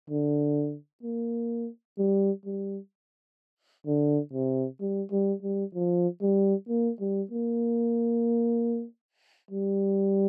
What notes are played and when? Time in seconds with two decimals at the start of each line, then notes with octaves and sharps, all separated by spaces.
0.10 D3
1.03 A#3
1.98 G3
2.45 G3
3.87 D3
4.33 C3
4.81 G3
5.11 G3
5.43 G3
5.75 F3
6.22 G3
6.69 A#3
7.00 G3
7.31 A#3
9.51 G3